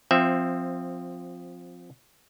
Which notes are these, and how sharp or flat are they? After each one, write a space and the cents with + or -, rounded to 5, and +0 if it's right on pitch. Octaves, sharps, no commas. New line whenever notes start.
F3 +15 C4 +0 E5 +0